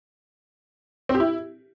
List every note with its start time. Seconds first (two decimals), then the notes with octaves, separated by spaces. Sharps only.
1.09 C4
1.15 G4
1.20 E4